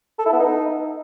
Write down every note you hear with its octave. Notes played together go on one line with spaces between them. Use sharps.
A4
E4
B3
D#4